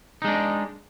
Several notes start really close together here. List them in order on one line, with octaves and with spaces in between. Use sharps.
D#4 G#3 D4